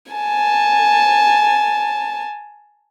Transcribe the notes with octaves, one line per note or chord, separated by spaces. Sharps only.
G#5 A5